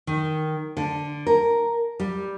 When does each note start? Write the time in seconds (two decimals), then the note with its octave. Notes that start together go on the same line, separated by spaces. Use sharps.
0.07 D#3
0.77 D3
1.27 A#4
2.00 G3